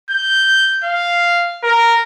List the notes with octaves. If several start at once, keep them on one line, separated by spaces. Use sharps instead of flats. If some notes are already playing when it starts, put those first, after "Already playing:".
G6
F5
A#4